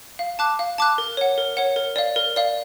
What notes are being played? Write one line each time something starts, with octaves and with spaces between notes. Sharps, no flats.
F5
A5 D6 F#6
F5
A5 D6 F#6
A#4
C#5 F#5
A#4
C#5 F#5
A#4
D5 F5
A#4
D5 F5